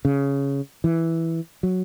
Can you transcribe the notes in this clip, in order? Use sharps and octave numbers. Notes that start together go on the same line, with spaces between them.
C#3
E3
F#3